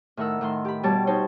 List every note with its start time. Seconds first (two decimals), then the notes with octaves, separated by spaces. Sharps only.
0.17 A2 D#3 A#4 F#5 E6
0.41 A2 D#3 C6
0.65 G4 B5
0.83 B2 G3 C#5 A5 D6
1.07 D#4 C5 C#5 A5